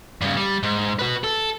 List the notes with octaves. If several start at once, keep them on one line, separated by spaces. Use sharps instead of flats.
G2 C#3
G3
G#2
F#4 B4
A4